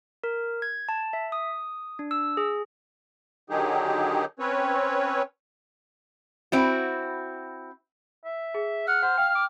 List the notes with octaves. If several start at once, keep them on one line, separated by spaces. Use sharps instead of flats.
A#4
G#6
A5
E5
D#6
D4
E6
G#4
D3 D#3 F#3 D#4 G4 G#4
C4 C#4 B4 C#5
C4 E4 F#4
E5
G#4
F#5 F6
C5 F#5
F5 G5
D6